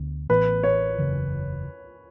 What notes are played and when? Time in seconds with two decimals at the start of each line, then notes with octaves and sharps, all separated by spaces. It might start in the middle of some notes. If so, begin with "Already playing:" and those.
Already playing: D2 D3 B3
0.29 A1 A2 E3 B3 B4
0.63 C#5
0.98 F#1 E2 C#3 E3